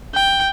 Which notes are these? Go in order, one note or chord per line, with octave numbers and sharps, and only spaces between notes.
G5